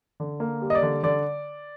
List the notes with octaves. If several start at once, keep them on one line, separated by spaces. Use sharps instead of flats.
D3
A#3
G3
D#5
D5
D3
D3 D5